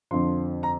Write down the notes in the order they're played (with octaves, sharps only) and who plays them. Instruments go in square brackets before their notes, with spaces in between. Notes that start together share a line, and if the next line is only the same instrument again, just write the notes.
[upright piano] F2 D3 F3 C6
A#5